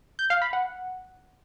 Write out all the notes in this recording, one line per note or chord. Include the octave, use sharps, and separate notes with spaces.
G6
F5
B5
F#5